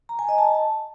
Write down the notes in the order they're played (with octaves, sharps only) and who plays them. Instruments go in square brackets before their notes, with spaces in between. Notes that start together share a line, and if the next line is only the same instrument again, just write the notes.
[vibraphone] A#5
G#5
D#5
A5